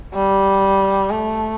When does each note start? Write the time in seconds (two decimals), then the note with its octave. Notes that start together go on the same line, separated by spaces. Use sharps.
0.14 G3
1.10 A3